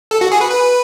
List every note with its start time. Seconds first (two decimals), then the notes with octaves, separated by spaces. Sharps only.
0.11 A4
0.21 F#4
0.32 G#4
0.41 B4
0.51 B4